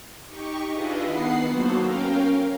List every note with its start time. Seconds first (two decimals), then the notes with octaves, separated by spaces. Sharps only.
0.25 D#4 G4 C#6
0.70 D4 E4 F4 G#4 B4 D#5
1.03 D#3 B3 B4 F#5 C7
1.48 F#3 A#3 B3 F#4 A4 C5
1.79 C#4 A#4 F5 G5